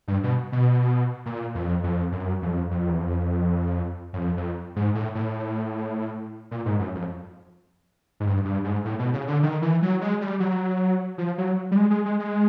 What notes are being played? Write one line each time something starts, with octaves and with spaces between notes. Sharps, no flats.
G2
B2
B2
A#2
F2
F2
F#2
F2
F2
E2
F2
F#2
F2
F2
G#2
A2
A2
A#2
G#2
F#2
F2
G#2
G2
G2
G#2
A2
B2
C#3
D3
D#3
E3
F#3
G#3
G3
F#3
F3
F#3
G3
G#3
G#3
G#3
G#3